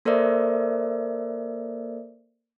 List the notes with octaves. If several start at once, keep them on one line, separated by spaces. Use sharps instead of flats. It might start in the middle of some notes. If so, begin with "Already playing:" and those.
A#3 A4 A#4 C5 D5 E5